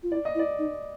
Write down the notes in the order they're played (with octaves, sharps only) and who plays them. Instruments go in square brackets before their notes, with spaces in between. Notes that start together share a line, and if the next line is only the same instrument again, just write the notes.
[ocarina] F4
[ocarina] E4 [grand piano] D5
[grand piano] D#5
[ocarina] E4
[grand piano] D5
[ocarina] D#4